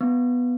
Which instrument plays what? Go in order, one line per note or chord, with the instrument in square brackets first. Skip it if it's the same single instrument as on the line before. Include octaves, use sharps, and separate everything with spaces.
[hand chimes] B3